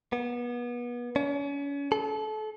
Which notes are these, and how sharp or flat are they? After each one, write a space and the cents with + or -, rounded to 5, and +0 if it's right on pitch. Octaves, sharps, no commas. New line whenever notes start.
B3 -30
C#4 +35
A4 -30